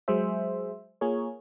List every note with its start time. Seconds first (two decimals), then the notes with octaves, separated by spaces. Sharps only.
0.08 F#3 G#3 G#4 C5 E5
1.01 A#3 F4 G#4 A#4 C#5